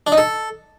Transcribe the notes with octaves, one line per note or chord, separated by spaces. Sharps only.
D4
D#4
A4